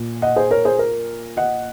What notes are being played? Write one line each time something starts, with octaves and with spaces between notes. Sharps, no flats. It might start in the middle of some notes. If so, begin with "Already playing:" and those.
Already playing: A#2
D#5 F#5
G#4 C5
A#4 C#5
G#4 C5
A#4
D#5 F#5